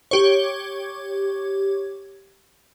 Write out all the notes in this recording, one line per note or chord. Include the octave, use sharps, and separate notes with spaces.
G4 C#5